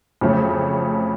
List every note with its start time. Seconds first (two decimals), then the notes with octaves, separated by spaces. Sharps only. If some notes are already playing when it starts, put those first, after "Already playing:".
0.21 F2 C#3 F#3 A3 C#4